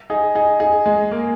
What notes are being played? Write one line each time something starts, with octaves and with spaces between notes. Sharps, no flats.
D#4 G#4
D#4 G#4
D#4 G#4
G#3
A#3